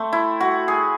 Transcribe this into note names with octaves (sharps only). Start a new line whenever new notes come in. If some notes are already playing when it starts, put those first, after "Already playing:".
Already playing: A3 C4
E4
F#4
G#4